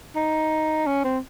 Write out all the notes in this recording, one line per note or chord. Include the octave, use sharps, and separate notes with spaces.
D#4
C#4
C4